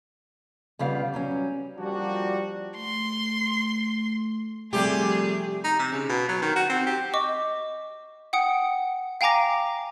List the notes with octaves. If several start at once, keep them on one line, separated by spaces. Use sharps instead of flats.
F2 C#3 G3 B3 F5
F#3 G3 C#4
F3 G3 A#3 D4 F4 F#4
A3 C6
C3 F3 G3 A3 G4 G#4
D#4
C3
C#3
B2
F#3
D#3
F#4
C4
G4
D#5 C#6 D6
F#5 G5 D#6 C#7
F5 G5 G#5 A#5 D6 A#6